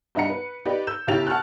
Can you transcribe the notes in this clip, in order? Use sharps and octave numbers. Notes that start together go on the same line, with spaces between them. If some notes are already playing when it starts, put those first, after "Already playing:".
G2 D#4 E5 F#5 A#5 C#7
B4
D#4 G4 B4 D5
E6 G6 E7
B1 C#3 E4 G4 A6 F7
F#5 A5 C#6 F6 F#6